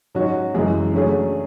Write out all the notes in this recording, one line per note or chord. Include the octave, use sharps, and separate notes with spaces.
G#2 F#3 C#4 F#4
F#2 C#3 E3 G#3
D3 F#3 A3 C#4 G#4